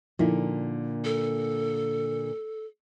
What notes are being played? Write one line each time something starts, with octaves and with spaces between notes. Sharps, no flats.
A#2 D3 F3 D#4 E4
A4